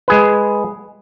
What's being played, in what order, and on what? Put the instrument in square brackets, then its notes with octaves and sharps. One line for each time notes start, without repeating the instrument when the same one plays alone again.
[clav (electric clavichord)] G#3 G#4 B4